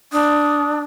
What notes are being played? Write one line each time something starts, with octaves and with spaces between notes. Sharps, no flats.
D4 D#6